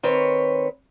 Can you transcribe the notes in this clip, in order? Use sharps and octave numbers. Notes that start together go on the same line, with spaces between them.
D#3 C4 B4 C#5